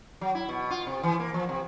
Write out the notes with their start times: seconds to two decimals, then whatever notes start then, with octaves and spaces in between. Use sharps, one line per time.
0.21 F#3
0.35 E4
0.49 B2
0.70 F4
0.87 C3
1.03 E3
1.20 A#3
1.34 F3
1.49 C3